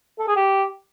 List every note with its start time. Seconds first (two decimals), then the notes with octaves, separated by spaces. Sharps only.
0.19 A4
0.28 G#4
0.36 G4